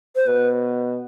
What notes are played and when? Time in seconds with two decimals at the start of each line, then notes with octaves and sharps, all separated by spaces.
0.16 C5
0.27 B2 B4